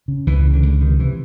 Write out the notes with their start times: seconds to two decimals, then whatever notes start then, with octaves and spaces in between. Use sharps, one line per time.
0.08 C#3
0.27 C#2 E3
0.45 C#3
0.53 D3
0.63 C#2
0.81 C3 D#3
0.99 C3 E3